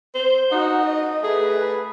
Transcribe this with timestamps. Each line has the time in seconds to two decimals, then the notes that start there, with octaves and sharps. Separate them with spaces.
0.15 C5
0.52 D#4 F#4
0.86 D#5
1.24 A3 G#4 B4